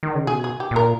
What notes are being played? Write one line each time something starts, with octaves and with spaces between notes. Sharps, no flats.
D#3
C#3
B2 G#4
G#4
G4
A#2 A#4